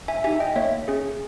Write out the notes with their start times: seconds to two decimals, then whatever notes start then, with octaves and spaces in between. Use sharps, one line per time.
0.08 E5 G#5
0.24 D#4 G4 E5 G#5
0.40 D#5 G5
0.56 A#3 C#5 E5
0.88 C#4 G#4